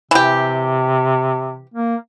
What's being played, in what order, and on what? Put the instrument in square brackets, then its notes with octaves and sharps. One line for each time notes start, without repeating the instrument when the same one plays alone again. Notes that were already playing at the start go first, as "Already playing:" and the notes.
[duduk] C3 [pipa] E3 G4
[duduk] A#3